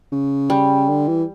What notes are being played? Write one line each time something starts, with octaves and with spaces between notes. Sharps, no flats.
C#3
G3
D3
E3